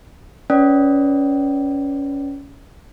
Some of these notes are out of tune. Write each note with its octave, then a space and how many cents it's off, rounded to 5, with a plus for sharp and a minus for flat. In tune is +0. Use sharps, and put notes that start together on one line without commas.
C#4 +15 B4 +0 D5 +0